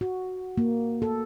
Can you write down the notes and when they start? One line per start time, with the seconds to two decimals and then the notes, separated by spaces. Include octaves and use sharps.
0.01 F#4
0.57 A#3
1.02 A4